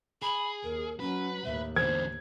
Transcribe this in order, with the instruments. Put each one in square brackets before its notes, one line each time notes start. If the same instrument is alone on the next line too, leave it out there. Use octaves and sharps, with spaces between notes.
[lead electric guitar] G#4 [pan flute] B5
[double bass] D#2 [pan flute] A#4
[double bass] F#3 [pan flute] C#4 [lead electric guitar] B4
[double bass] D#2 A2 [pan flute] E5
[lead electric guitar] E2 D3 [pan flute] C5 [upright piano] G#6